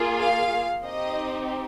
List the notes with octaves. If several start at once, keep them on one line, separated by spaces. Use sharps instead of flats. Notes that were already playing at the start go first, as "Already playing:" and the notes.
Already playing: A#3 F4 G#4
F5
C4 D#4 G4 D#5